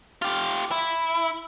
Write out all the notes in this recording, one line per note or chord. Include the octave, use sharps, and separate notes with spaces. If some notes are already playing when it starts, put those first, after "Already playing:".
F4 G4
E4